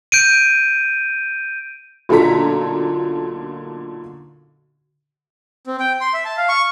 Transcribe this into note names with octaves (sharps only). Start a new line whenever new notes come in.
G6 D7 D#7
B1 A#2 D3 A4 A#5 B6
C4
G5
C6
E5
A5
F5
C#6